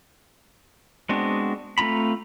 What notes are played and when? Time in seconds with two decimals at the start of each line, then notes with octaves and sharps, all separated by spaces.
1.09 G#3 B3 C4 D4 F#4
1.78 A3 C4 F4 A#5 B5